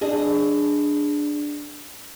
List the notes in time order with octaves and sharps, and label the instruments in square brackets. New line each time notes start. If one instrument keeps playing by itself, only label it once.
[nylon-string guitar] D4 G#4 D#5